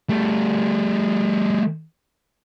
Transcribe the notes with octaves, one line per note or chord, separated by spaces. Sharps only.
G3 A3